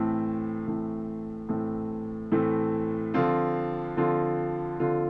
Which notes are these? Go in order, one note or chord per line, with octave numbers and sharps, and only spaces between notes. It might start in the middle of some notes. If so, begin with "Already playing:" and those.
Already playing: A2 E3 A3 C4
A2 E3 A3 C4
A2 E3 A3 C4
A2 E3 A3 C4
D3 F3 C4 F4
D3 F3 C4 F4
D3 F3 C4 F4